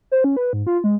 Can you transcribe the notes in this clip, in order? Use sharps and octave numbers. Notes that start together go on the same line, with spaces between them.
C5
C#4
B4
G#2
F4
G#3